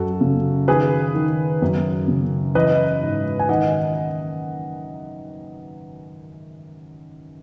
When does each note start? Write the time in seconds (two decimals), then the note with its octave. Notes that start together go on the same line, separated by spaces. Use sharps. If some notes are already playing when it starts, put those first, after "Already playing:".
Already playing: F#2 F#4 A4
0.21 C#3
0.68 D#3 G#4 B4
1.15 D#3
1.62 F#2
2.08 C#3
2.55 E3 B4 D#5
3.03 G#2
3.39 G#5
3.49 D#3 D#5 F#5